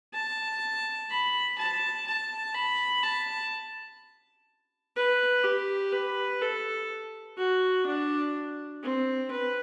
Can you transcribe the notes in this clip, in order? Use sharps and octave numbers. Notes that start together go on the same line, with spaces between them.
A5
B5
A5
A5
B5
A5
B4
G4
B4
A4
F#4
D4
C4
B4